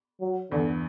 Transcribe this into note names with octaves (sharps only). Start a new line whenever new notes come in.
F#3
E2 G2 D3